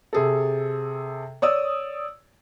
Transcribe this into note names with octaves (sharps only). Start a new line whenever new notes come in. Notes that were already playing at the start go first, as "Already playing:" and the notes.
C3 G#4 A4
C#5 D5 D#6 E6